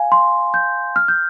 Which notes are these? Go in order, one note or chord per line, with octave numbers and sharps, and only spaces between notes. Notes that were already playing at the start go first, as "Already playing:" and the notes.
Already playing: F5 G#5
C6
G6
F6
G6